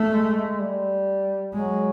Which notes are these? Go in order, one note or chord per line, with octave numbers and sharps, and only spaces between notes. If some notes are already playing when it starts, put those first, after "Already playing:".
Already playing: A3
G#3
G#3
G3
F#3 G#3